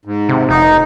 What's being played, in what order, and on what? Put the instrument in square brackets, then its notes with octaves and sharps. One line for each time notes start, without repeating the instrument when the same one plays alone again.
[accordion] G#2
[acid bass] C3
[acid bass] F1 [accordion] D#4